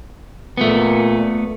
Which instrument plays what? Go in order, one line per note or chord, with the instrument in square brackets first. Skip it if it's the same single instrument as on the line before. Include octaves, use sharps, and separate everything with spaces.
[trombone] A#2 [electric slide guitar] A3 B3